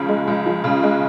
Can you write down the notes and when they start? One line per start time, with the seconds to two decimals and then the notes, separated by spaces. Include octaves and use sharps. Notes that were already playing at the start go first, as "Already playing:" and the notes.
Already playing: C#2 C#3 F3
0.09 G#3
0.28 C#2
0.46 F3
0.64 C#3
0.83 G#3